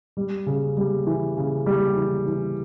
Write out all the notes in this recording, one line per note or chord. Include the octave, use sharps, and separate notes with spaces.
G3
C#3
G3
E3
C#3
G3
E3
E3